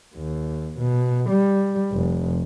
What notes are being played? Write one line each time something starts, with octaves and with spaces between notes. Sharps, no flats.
D#2
B2
G3
F1